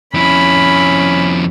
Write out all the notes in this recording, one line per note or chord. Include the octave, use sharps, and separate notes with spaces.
F2 C#4 E4 B5